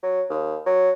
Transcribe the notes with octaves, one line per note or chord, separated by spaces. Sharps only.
F#3
D#2
F#3